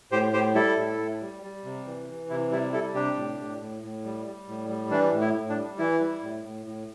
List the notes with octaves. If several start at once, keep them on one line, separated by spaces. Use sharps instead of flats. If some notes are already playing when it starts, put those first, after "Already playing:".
A2 G4 C5
A2 G4 C5
G3 E4 A4
A2
A2
G3
G3
C3
E3
E3
C3 E4
G3 E4
G3 E4 A4
C3 D4 G4
A2
A2
A2
A2
G3
G3
A2
G3
E3 D4
A2
E4
A2
D4
G3
E3 E4
G3
A2
A2
A2